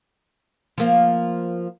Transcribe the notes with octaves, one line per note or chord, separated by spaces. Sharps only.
F3 A#3